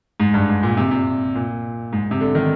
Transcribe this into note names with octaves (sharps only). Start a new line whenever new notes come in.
G#2
G2
G#2
A#2
C3
C3
A#2
G#2
C3
D3
D#3